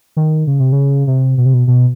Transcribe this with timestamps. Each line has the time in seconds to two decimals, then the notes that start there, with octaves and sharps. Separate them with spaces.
0.16 D#3
0.47 C#3
0.60 C3
0.72 C#3
1.07 C3
1.38 B2
1.46 C3
1.54 B2
1.68 B2